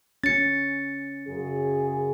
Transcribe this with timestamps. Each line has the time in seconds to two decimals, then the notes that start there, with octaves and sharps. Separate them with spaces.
0.24 C#4 A6 C#7
1.28 F#2 C#3 G#4